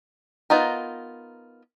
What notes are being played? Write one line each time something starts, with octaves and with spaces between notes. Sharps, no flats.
B3 D#4 F4 A#4